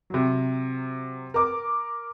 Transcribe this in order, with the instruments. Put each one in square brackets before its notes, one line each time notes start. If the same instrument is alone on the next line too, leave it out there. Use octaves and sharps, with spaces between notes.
[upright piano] C3 F#3
A#4 D6